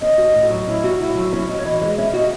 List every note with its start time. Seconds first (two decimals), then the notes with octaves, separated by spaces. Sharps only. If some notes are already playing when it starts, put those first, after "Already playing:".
0.01 C#4 D#5
0.18 F#4
0.35 A2
0.50 F#3
0.67 C#4 E4
0.84 F#4
0.99 A2 E4
1.15 F#3
1.33 C#4 E4
1.48 F#4 D#5
1.59 C#5
1.65 E3 D#5
1.81 G#3 D#5
1.97 C#4 E5
2.13 F#4 D#5